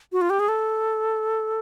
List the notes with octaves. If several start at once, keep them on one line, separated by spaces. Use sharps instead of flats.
F#4
F4
G4
G#4
A4